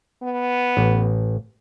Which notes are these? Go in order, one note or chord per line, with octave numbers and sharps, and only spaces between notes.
B3
A1